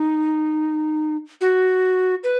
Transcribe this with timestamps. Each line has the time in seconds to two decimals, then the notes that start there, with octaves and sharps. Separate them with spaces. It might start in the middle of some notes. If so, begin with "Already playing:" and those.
Already playing: D#4
1.41 F#4
2.24 B4